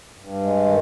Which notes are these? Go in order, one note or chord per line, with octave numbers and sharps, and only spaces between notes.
G2
G#3
D#3